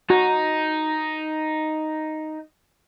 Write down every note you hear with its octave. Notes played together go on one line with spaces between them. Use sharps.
D#4 F#4